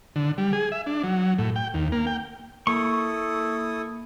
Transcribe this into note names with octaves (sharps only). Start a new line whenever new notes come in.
D3
G3
G#4
E5
D4
F#3
A2
G5
D#2
A#3
G5
A#3 E4 A4 C#6 D#6